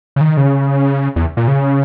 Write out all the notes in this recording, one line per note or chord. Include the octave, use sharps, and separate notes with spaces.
C#3
D#3
C#3
E2
A#2
C#3